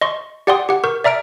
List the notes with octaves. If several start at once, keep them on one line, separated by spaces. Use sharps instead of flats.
D#5 C6 C#6
G4 D5 F#5 G5 C6 D#6
G4 F#5
A#4 C#6 G6
D5 E5 A#5 F6 D7